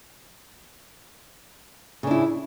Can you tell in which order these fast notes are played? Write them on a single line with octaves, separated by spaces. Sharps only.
C#3 D4 E4